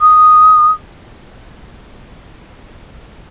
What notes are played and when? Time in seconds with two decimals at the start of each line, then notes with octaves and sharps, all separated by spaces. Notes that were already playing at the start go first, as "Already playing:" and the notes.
0.01 D#6